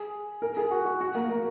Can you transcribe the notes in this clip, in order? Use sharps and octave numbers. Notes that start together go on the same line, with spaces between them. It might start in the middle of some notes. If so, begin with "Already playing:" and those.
Already playing: G#4
A#4
G#4
F#4
F#4
F#4
A#3
A#3